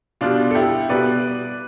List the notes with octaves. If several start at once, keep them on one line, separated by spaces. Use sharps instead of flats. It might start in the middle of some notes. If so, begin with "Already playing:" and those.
B2 G3 D4 F4
A4
E4 G4
B2 G3 B4 D5